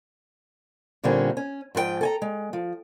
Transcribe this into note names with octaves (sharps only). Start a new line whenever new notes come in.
A#2 D3 G3 A#3 C4 C#4
C#4
G#2 F3 B4 G5
A4 G#5 A#5
G#3
F3